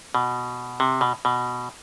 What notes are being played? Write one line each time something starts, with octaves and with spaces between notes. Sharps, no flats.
B2
C3
B2
B2